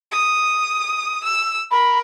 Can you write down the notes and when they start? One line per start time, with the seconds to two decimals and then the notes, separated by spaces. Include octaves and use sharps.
0.11 D#6
1.24 E6
1.71 A#4 B5